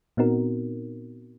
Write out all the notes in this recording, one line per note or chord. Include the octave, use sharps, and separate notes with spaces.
A#2 B3 C4 D#4 F#4 A#4